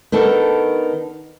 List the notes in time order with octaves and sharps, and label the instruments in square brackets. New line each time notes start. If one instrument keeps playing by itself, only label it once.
[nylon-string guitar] D#3 B3 D4 A4